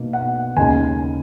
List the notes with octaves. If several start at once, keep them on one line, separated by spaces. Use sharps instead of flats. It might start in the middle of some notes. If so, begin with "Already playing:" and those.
Already playing: B2 A#3 D#4
F#5
D#2 C#3 G#3 D#4 G#5